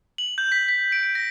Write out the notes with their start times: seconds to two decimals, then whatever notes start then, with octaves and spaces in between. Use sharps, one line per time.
0.18 F#7
0.38 G6
0.52 B6
0.69 B6
0.92 D7
1.15 A#6